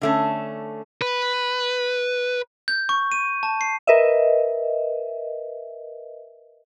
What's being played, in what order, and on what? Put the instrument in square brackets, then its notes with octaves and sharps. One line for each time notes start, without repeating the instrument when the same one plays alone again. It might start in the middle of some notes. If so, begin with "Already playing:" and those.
[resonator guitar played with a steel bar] D3 A3 C#4
[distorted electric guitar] B4
[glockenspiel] G6
C#6
D#7
A5
C7
[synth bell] A#4 B4 D#5 E5